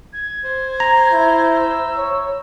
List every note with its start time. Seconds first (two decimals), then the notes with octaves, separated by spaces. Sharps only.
0.13 G#6
0.45 C5
0.80 A#5
1.12 E4
1.56 E6
1.97 C#5